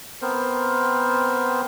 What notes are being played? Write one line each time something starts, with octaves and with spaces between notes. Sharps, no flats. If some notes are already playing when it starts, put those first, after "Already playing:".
B3 C4 A#4 C5